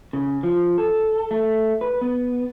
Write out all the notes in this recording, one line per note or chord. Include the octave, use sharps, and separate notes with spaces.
C#3
F3
A4
A3
B4
B3